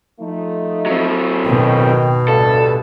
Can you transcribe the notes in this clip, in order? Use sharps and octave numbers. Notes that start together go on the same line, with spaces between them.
F3 A3 D#4
F#3 C4
B2 D#3 G5
D2 G2 A4